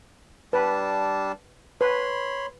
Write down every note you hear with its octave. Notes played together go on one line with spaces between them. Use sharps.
G3 D4 B4 A5
B4 C#5 B5 C6